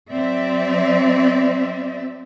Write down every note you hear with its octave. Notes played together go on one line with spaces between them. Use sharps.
F#3 C4 D5 E5